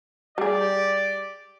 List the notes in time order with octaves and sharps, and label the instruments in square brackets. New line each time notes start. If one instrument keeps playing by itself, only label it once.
[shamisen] G3 G#4 [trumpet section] G4 D5